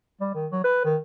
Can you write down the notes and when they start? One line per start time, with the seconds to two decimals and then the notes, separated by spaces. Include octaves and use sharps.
0.21 G3
0.34 D#3
0.52 F#3
0.64 B4
0.85 D#3